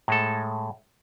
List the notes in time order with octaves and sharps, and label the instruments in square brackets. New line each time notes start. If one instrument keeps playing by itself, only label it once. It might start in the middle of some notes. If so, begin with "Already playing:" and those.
[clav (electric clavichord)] A2 G#3 A4